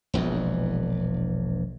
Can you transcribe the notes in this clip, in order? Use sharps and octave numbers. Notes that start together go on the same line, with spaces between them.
E1 A#1 E2